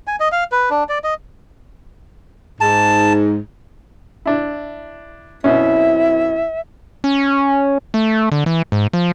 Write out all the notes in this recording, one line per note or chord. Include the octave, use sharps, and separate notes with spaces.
G#5
D#5
F5
B4
D4
D5
D#5
G#2 A5
D4 E4
F#2 B2 C4 C#4 E4 E5
C#4
A3
D3
E3
G#2
F3